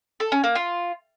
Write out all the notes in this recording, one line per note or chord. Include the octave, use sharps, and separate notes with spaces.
A4
C#4
A#3
F4